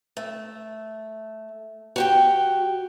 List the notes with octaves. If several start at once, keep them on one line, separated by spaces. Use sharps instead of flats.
A3
F#4 G4 G5